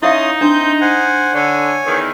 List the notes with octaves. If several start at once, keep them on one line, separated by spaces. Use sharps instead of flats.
C#4 D#4 E4 E5 F5 C6 D#6
C4 D4 G6
C5 F#5 G#5
D3 C#5 G#5
E2 D#3